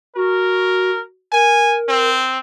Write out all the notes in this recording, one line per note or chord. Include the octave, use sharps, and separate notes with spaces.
F#4 A#4
A#4 G#5
C4